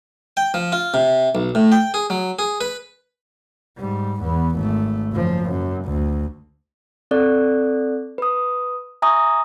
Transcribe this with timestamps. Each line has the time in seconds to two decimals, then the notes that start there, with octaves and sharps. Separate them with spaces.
0.37 G5
0.54 F3
0.72 F4
0.94 C3
1.35 B1
1.55 A2
1.72 G5
1.94 G#4
2.10 F#3
2.39 G#4
2.61 B4
3.78 G#2 G3
4.23 E2 B3
4.57 G#1 A3
5.13 F#1 F3
5.50 F#2
5.85 D2
7.11 C4 A4 D5 F#6
8.18 B4 D#6
9.02 E5 G#5 A#5 C#6 D#6